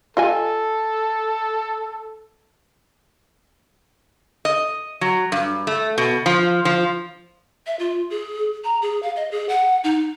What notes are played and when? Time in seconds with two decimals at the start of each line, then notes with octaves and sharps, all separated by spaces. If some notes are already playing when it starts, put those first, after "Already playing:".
0.17 F4 A4 D#5 G#5
4.45 D#5
5.01 F#3
5.32 G2
5.67 A3
5.98 B2
6.26 F3
6.65 F3
7.67 E5
7.79 F4
8.10 G#4
8.64 A#5
8.82 G#4
9.03 F5
9.16 D#5
9.31 G#4
9.49 F#5
9.84 D#4